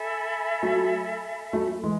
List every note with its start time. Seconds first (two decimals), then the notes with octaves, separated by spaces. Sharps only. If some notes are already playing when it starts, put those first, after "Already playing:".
Already playing: A4 E5 G#5 B5
0.62 F#3 A3
1.53 F#3 A3
1.83 E3 G#3